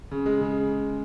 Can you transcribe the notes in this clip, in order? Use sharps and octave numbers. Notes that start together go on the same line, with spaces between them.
C#3
G#3
C#3